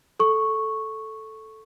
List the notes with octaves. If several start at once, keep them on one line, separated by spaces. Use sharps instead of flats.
A4 C#6